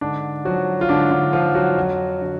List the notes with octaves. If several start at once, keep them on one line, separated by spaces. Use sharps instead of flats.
G#2 D3 D4
F3 F#3 F#4
F4
G#2 D3 D4
D3 D4
F3 F4
F#3 F#4
F2
D3 F#3